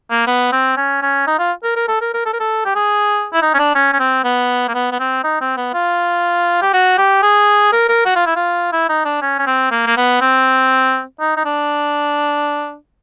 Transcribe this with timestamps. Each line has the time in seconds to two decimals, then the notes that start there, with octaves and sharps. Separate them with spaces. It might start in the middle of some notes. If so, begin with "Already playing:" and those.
0.10 A#3
0.27 B3
0.52 C4
0.77 C#4
1.02 C#4
1.27 D#4
1.39 F4
1.63 A#4
1.76 A#4
1.88 A4
2.01 A#4
2.14 A#4
2.25 A4
2.33 A#4
2.40 A4
2.65 G4
2.75 G#4
3.33 E4
3.42 D#4
3.54 C#4
3.59 D4
3.75 C#4
3.93 C#4
4.00 C4
4.24 B3
4.68 A#3
4.74 B3
4.92 B3
5.00 C4
5.24 D#4
5.41 C4
5.57 B3
5.74 F4
6.62 G4
6.73 F#4
6.98 G4
7.23 G#4
7.72 A#4
7.89 A#4
8.05 F#4
8.16 F4
8.26 E4
8.36 F4
8.72 E4
8.89 D#4
9.05 D4
9.22 C#4
9.39 C#4
9.47 C4
9.71 A#3
9.87 A#3
9.97 B3
10.21 C4
11.20 D#4
11.37 D#4
11.45 D4